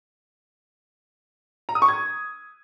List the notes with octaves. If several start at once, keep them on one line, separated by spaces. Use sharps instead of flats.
A#5
D#6
C#6
G#6